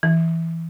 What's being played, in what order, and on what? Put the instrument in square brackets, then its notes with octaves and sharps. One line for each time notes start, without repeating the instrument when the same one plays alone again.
[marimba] E3